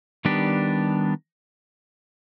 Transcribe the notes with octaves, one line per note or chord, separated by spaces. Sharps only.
D#3 G3 B3 D4 G4